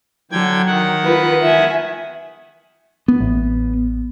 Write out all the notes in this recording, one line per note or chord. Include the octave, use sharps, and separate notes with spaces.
D3 F#3 G5 G#6
D#3 F#5
F4 B4
E5 G#5
B3
A1